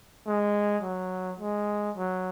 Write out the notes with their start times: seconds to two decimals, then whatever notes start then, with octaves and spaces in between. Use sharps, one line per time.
0.27 G#3
0.83 F#3
1.40 G#3
1.96 F#3